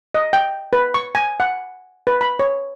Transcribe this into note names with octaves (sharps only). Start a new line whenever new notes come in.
D#5
G5
B4
C#6
G#5
F#5
B4
B5
C#5